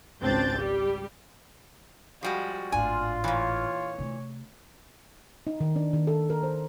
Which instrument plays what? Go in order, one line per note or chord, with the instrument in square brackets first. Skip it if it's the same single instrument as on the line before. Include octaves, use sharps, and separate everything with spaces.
[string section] G#1 C#2 C4 D4 G6 A6
G3 G4
[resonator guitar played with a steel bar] F3 G3 G#3 [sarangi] F#4
[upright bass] G#1 A2 [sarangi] D4 [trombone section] F4 [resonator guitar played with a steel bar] G#5
[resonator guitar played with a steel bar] A#2 E3 [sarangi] C#5
[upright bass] C3 A3
[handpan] D#4
D#3
D4
D#3
A4
A#4
C5